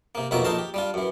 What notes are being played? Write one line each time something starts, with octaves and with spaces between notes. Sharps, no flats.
C3 A#3
F2 B2 D#3 A#3 C#5 E5
A#1 D#4 A4 A#4 C5 A5
G4
G3 D4 F4
F#2 E3